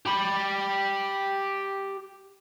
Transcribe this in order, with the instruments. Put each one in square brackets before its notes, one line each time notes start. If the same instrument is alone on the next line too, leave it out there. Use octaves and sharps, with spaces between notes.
[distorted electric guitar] G4 B5